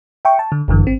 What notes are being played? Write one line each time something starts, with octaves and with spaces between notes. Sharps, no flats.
E5 G5 C#6
A5
D3
G1 F#2 D3 E3
G#1 C4